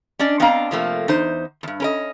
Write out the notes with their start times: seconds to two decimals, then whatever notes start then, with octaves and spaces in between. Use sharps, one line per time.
0.19 C#4 D4 D5 D#5
0.40 B3 C4 D4 D#5 F5 A#5
0.71 C3 F3 A3 A#3
1.08 E2 D#4 C5
1.63 E2 G2
1.80 C#4 A#4 D#5